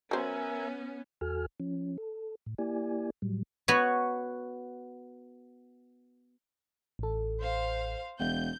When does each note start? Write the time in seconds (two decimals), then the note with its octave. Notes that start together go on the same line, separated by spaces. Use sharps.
0.11 F#3 B3 C#4 A#4 C5 E5 G#5
1.21 E2 F#4 A4 G#5 F6
1.60 F3 C#4
1.98 A4
2.46 A2
2.58 A#3 E4 G4 D5 G#5
3.22 A2 F#3 G3
3.68 B3 F#4 B4 C#5
6.99 A1 A4
7.41 C5 F5
8.19 E1 G6